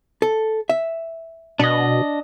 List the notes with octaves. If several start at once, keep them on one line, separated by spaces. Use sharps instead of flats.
A4
E5
B2 D4 D#5